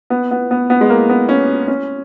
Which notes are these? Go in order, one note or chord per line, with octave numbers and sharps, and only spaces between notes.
B3
B3
B3
B3
G#3
A#3
B3
C#4
C#4